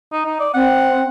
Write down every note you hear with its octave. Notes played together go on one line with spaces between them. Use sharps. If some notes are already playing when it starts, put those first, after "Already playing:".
D#4
D#4
D5
C4 F#5